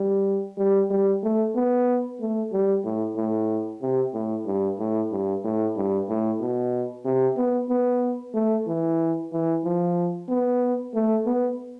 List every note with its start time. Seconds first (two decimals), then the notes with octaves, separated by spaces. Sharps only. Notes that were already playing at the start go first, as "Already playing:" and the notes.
Already playing: G3
0.58 G3
0.90 G3
1.23 A3
1.55 B3
2.20 A3
2.52 G3
2.84 A2
3.16 A2
3.82 C3
4.14 A2
4.46 G2
4.79 A2
5.12 G2
5.44 A2
5.76 G2
6.09 A2
6.40 B2
7.05 C3
7.37 B3
7.70 B3
8.34 A3
8.67 E3
9.32 E3
9.64 F3
10.29 B3
10.94 A3
11.26 B3